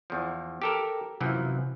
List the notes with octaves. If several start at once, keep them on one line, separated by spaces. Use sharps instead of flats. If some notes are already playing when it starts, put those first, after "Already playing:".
E2 F3
G4 A4 A#4
F#2 C3 E3 F3